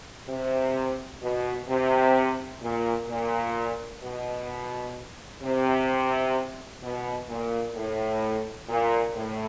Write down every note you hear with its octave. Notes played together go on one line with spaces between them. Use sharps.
C3
B2
C3
A#2
A#2
B2
C3
B2
A#2
A2
A#2
A2